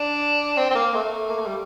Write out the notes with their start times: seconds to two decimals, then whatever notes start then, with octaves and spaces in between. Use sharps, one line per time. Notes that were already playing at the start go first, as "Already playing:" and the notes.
Already playing: D4
0.57 C4
0.71 C4
0.75 A#3
0.94 A3
1.30 A#3
1.39 A3
1.47 G3